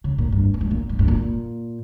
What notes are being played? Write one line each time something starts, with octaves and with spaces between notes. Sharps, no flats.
C#3
A#2
G2
G2
G#2
A#2
G#2
G2
A#2